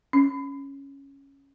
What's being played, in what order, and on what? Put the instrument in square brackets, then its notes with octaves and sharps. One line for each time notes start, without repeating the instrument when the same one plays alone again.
[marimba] C#4